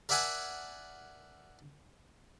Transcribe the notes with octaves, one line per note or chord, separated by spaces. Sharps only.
A#4 D5 E5 F#5 G#5 A5